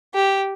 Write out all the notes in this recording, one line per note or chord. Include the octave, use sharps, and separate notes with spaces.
G4